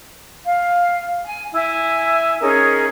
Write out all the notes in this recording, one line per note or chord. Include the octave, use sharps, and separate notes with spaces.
F5
G#5
E4 G#5
C#4 D#4 G#4 A#4